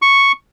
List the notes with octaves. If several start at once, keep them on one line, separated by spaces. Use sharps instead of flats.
C#6